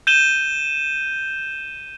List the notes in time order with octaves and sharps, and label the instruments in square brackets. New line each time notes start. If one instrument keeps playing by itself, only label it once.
[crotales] G6 D#7 E7 G7